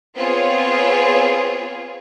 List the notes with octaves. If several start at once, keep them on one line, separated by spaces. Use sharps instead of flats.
B3 C4 F4 G#4 C#5